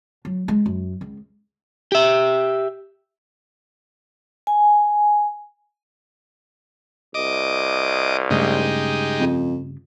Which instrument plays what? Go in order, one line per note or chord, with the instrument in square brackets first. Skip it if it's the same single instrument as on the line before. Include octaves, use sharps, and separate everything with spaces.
[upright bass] F#3
G#3
F#2
C#2
[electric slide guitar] G4 E5
[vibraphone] G#5
[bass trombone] C2 [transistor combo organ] D#5 D6
[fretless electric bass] G2 C#3 A3 [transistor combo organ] G#3 D#4 G4
[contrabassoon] F2